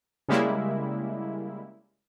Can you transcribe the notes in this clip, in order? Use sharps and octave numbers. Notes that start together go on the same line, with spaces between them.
C#3 G3 G#3 A#3 E4